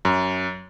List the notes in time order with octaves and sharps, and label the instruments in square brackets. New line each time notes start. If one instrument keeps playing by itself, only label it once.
[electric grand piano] F#2